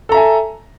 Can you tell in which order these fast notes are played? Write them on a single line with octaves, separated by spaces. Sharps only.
A4 A#5 E5 G#5